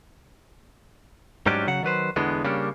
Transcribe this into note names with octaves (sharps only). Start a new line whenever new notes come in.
G#2 F#3 G3 C#4 D4 G4
C#3 F#3 F#5
D#3 F#3 B4 C5
E2 D3 E3 G#3 B3
C#3 G3 A#3 C#4 D4